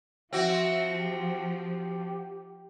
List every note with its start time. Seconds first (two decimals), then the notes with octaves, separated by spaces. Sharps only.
0.33 F3 C4 F#4 E5
0.99 G4